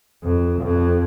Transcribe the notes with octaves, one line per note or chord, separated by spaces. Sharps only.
F2
F2